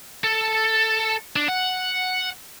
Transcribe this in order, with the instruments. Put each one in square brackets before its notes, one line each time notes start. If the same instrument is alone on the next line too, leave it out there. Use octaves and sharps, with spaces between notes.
[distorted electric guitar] A4
D4
F#5